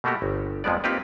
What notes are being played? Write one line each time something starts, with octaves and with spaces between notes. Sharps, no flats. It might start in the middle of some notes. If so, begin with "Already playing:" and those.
B2 A3 A#3 F#4 G4
G1
F2 F3 G#3 B3 D5
A#3 C4 D#4 F4 G4 B4